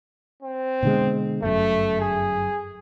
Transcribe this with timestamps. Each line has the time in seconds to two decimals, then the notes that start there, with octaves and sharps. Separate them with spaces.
0.42 C4
0.83 B2 D3 G#3
1.42 G1 F#2 A3
2.01 G#4